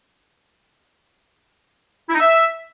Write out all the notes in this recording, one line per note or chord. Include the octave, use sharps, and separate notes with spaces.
E4
D#4
E5